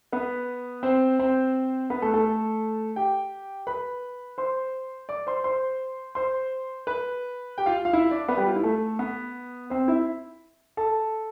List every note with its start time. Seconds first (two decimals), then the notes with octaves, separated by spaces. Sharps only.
0.12 B3 B4
0.83 C4 C5
1.20 C4 C5
1.90 B3 B4
2.02 A3 A4
2.14 A3 A4
2.96 G4 G5
3.67 B4 B5
4.38 C5 C6
5.09 D5 D6
5.27 C5 C6
5.44 C5 C6
6.15 C5 C6
6.87 B4 B5
7.58 G4 G5
7.66 F4 F5
7.85 F4 F5
7.93 E4 E5
8.11 D4 D5
8.29 B3 B4
8.37 G3 G4
8.46 F4
8.56 E4
8.64 A3 A4
8.99 B3 B4
9.70 C4 C5
9.88 E4 E5
10.77 A4 A5